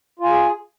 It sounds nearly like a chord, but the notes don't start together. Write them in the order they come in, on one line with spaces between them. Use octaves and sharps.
F4 G#5 G#4